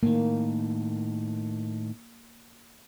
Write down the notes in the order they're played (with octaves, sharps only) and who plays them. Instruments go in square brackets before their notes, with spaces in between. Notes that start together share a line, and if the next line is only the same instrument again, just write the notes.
[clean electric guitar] A2 D#3 [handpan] A#3